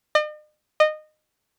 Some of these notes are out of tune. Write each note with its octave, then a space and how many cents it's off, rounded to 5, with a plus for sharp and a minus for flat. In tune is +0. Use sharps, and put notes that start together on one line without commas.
D#5 -45
D#5 -20